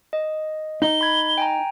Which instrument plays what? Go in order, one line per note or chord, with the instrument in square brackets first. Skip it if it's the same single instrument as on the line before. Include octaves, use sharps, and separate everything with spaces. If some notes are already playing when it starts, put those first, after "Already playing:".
[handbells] D#5
[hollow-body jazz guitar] D#4 [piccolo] G7
[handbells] B5 G#6
G5 G#5 A#5